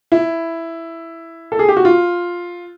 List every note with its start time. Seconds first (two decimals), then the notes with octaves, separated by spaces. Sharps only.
0.12 E4
1.52 A4
1.59 G#4
1.68 G4
1.77 F#4
1.85 F4